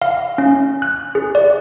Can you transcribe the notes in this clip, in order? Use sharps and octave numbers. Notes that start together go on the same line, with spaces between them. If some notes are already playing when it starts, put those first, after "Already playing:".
F5
C#4
F#6
G#4
D5